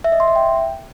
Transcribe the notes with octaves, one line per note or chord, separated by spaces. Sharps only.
E5
D#5
C6
E5
G5